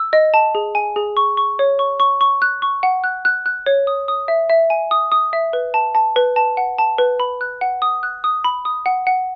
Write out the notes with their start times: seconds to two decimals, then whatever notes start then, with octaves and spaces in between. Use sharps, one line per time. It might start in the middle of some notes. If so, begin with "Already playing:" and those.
Already playing: E6
0.13 D#5
0.34 A5
0.55 G#4
0.75 G#5
0.96 G#4
1.17 C#6
1.37 C#6
1.59 C#5
1.79 C#6
2.00 C#6
2.21 C#6
2.42 F#6
2.62 C#6
2.83 F#5
3.04 F#6
3.25 F#6
3.46 F#6
3.66 C#5
3.87 D#6
4.08 D#6
4.28 E5
4.50 E5
4.70 G#5
4.91 D#6
5.12 D#6
5.33 E5
5.53 B4
5.74 A5
5.95 A5
6.16 B4
6.36 A5
6.57 F#5
6.78 A5
6.98 B4
7.20 B5
7.41 F#6
7.61 F#5
7.82 D#6
8.03 F#6
8.24 D#6
8.44 B5
8.65 D#6
8.86 F#5
9.07 F#5